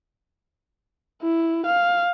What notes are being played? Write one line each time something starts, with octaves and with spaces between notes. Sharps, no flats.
E4
F5